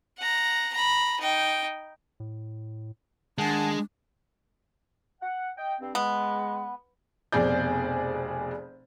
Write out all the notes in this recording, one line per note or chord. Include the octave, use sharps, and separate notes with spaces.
F#5 A#5
A#5 B5
D#4 G5
A2
D#3 G#3 D4 F#5 G#5 A5
F#5
D#5 G5
G2 C4
G#3 B3
F1 F2 B2 G#4 D5 G6